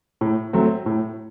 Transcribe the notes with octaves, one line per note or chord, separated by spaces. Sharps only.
A2
F#3 A3 C4
A2